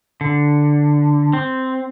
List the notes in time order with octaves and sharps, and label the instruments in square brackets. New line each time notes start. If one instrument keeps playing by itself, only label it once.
[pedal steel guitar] D3
C4